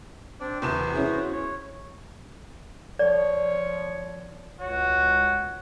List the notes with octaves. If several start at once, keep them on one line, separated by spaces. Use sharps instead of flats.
C4 D4 D5
E2 C3 B3 F#4 C5 E7
C#4 E4 G#4
C#5
F3 C#5 D5
C#2 F#4 C#5